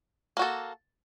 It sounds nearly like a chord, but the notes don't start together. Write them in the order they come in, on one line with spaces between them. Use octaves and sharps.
A#3 F#4 A4